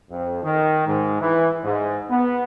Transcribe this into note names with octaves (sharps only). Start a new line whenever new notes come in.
F2
D#3
G#2
E3
G#2
B3